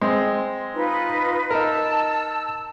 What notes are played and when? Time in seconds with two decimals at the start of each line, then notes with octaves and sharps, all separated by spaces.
0.02 G#3 C4
0.75 D#4 F4 B4
1.51 D#4 A#4 A5 E6